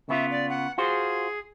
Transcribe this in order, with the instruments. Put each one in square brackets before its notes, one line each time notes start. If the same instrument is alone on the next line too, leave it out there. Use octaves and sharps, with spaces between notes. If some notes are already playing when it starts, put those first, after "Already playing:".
[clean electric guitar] C#3 B3 F4 [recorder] E5
[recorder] D5
F#5
[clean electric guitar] F4 F#4 C5 [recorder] G#4